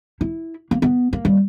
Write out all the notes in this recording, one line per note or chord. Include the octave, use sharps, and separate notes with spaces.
E4
A#3
B3
A#3
G3